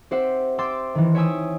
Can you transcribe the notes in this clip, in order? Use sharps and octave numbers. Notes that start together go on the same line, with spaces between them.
C4 G4 C5 E5 F#5
C5 G5 C6 D6 E6 A6
D#3 E3
C#5 E5 G5 G#5 D#6 E6